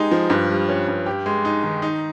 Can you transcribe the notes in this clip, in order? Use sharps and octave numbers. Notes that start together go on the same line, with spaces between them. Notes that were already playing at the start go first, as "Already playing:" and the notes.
Already playing: G#3 D#4 G4
F3
G2
G3
C#4
G2
G4
G#3
D#4
D#3
D#4